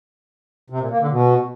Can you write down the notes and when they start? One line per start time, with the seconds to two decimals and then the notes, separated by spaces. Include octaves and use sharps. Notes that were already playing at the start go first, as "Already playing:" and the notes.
0.70 C3
0.80 A#2
0.90 A#3
1.00 D3
1.11 B2